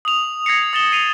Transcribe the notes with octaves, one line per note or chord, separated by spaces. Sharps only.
D#6 F7
G#6 A#6 C7 C#7
D#6 A6 E7 G7
C7 D#7 F7